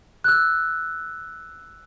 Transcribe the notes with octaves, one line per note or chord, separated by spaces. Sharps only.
E6 F#6